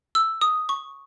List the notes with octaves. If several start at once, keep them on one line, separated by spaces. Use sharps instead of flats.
E6
D#6
C#6